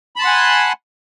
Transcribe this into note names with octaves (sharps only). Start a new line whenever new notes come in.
F#5 G#5 A5 B5 C6